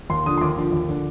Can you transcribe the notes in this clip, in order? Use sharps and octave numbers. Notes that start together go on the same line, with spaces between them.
D#2 C6
D3 F3 D#6
C6
D#2 D6
D3 F3
D#2
D3 F3